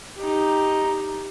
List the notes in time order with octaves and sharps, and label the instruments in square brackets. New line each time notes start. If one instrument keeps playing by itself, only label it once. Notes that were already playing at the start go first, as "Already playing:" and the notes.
[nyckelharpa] D#4 G4